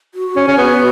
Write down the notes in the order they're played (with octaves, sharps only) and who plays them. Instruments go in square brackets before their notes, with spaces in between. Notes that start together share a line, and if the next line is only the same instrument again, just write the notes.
[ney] F#4
[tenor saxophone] C#4
C#4
B3